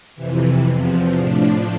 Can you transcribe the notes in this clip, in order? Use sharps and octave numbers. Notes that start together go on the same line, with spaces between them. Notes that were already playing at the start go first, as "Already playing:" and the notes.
F2 C3 E3
E2 C3 F3
A2 F3 D4